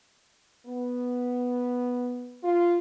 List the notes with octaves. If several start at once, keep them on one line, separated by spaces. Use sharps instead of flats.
B3
F4